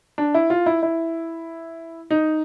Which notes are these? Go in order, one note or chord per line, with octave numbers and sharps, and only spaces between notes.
D4
E4
F4
E4
E4
D#4